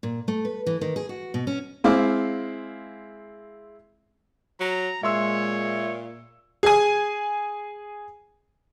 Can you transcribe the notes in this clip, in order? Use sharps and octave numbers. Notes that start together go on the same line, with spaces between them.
A#2
A3
B4
E3
D#3
G#4
F#4
B2
C#4
G#3 C4 E4 F5 D6
F#3 A#5
A#2 G#3 C#5 E5 C6 E6
G#4 G#5